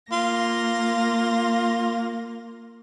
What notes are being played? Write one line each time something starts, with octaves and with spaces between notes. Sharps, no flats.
A#3 F4 A#6